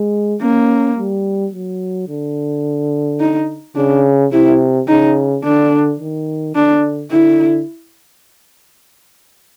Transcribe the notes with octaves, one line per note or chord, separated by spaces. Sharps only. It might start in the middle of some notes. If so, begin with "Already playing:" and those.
Already playing: G#3
A#3 C#4
G3
F#3
D3
D#4
C#3 D4
C3 E4
C#3 D#4
D3 D4
D#3
D3 D4
D3 E4